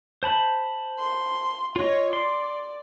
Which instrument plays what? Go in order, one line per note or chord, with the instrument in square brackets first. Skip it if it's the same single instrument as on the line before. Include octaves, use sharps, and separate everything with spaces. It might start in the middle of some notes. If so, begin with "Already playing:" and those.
[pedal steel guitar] C5 A5 B5
[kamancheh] C6
[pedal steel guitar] F4 D#5 [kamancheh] C#5
[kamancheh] D5 [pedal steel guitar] C6